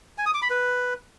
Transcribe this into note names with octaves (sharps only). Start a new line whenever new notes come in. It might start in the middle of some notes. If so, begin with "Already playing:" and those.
G#5
D#6
D6
B5
B4